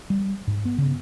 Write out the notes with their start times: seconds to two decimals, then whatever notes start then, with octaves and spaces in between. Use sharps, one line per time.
0.10 G3
0.47 G#2
0.65 B3
0.78 C#3